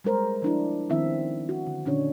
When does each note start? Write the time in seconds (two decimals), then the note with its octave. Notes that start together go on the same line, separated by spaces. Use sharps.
0.04 G3 G#3 A#4 C5
0.42 F3 D4 E4
0.90 D#3 F3 B3 C4 E4 E5
1.49 F#4
1.67 D3
1.85 A#2 D3 C#4 D4 C#5